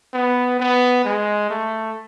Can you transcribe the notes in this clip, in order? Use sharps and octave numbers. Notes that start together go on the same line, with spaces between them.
B3
B3
G#3
A3